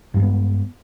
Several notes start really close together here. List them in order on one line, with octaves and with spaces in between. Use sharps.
G2 G3 G#3 B3